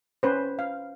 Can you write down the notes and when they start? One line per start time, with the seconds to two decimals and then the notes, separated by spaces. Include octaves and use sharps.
0.23 C#4 B4 C5
0.59 F5